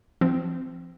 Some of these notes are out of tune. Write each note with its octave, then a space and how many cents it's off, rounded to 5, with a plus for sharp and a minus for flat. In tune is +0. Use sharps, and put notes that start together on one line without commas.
F3 -20 C4 -5